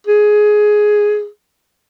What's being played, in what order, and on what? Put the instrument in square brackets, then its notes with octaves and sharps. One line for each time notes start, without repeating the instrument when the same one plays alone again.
[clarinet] G#4